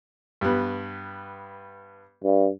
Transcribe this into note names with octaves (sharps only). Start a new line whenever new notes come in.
G2 B3
G2